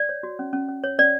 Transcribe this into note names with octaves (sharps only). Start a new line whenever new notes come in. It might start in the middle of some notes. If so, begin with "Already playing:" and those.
Already playing: D5
C#5
F#4
C#4
C#4
C#4
C#5
C#4 D5